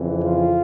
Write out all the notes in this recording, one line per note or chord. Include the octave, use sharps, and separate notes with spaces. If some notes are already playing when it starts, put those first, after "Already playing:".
Already playing: F2 C#3 E3
F4